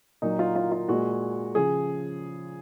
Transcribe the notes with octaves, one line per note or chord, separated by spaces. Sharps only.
A#2 F#3 A#3 D#4
F4
F4
F4
A#2 G#3 F#4
C#3 F3 G#4